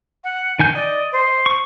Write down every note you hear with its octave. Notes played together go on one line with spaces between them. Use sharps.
F#5
D#3 G#5 G6
D5 D#5
C5
C#6